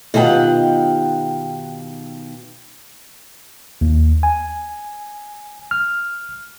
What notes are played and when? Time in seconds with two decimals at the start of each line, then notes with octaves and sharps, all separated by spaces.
0.14 B2 D#3 F4 G4 F#5
3.81 D#2
4.23 G#5
5.71 F6